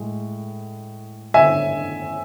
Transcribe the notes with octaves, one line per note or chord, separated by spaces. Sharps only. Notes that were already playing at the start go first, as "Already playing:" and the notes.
Already playing: A2 G#3
E5 G#5